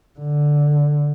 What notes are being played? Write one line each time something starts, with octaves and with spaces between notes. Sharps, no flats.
D3